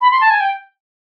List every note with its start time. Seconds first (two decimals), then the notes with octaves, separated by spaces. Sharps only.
0.01 B5
0.11 C6
0.21 A5
0.30 G#5
0.40 G5